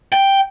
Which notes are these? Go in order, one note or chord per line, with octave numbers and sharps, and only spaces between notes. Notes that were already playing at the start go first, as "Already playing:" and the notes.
G5